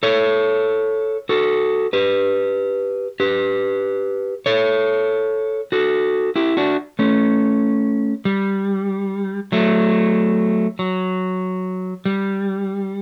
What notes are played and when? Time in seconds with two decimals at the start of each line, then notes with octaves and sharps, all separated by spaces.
0.03 A4 C#5
1.29 F#4 A4
1.93 G4 B4
3.20 G4 B4
4.46 A4 C#5
5.72 F#4 A4
6.36 E4 G4
6.57 D4 F#4
6.99 A3 C#4
8.25 G3
9.52 F#3 A3
10.79 F#3
12.05 G3